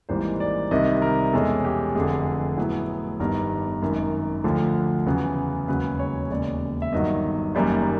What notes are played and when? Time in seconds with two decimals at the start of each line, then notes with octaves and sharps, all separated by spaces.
0.09 G#1 G#2 E3 G3 A#3 C5
0.40 D5
0.71 C2 C3 D#3 G3 D#5
1.02 A#4
1.33 E2 B2 G#3 C#4 A4
1.65 G4
1.95 F1 F2 D3 G#4
2.57 A2 F#3 B3 E4
3.19 G1 G2 D#3 G3 B3 A#4
3.82 G#1 F#2 D#3
4.44 D2 D3 F3
5.06 E2 C#3 F#3 B3
5.68 E1 D#2 C#3 F#3 B4
5.99 C#5
6.30 E1 D#2 C#3 D5
6.82 E5
6.93 G1 G2 D#3 F#3 D#5
7.55 F#1 F#2 D#3 G3 A#3